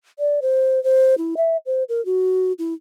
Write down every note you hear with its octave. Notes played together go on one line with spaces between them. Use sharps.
D5
C5
C5
E4
E5
C5
A#4
F#4
E4